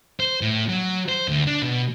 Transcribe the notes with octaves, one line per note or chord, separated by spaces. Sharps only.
C5
A2
F#3
C5
D2
D4
B2